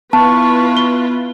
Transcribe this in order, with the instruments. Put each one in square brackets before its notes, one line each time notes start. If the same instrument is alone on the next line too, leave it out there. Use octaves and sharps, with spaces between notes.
[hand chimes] B3 [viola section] E4 F4 B4 [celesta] A5 [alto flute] C#6
[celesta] G7